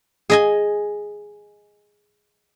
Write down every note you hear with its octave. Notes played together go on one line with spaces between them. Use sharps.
G#4 D#5 G#5